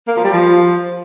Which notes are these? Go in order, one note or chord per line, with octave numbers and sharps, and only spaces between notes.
A#3
F3
G3
F3